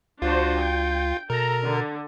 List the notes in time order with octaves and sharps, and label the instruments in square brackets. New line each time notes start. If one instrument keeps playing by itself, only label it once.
[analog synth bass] C#2 [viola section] D4 F#4 C5 [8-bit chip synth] F4
[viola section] G5
[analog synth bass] B2 [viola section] A4 A#5 [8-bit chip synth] A#4
[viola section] D3